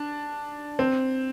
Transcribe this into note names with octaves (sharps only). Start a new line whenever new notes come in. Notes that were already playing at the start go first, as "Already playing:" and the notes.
Already playing: D4
C4